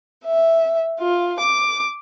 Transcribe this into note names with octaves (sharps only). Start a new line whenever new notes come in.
E5
F4
D6